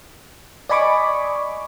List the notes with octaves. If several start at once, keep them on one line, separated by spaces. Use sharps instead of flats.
D5 D#5 G#5 B5 C#6 D6